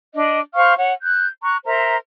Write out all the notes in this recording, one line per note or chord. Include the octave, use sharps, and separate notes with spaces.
D4 D#5
C5 F5 C#6 F6
C#5 F#5
F#6 G6
A#5 C#6 F#6
A#4 C5 E5 A#5